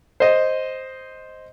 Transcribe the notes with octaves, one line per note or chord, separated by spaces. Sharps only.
C5 D#5